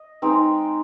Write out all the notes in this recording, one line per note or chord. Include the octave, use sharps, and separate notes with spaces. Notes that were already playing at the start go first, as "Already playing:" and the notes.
Already playing: D#5
G#3 C4 D#4